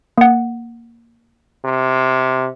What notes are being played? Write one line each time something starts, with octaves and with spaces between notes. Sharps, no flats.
A#3 F#5
C3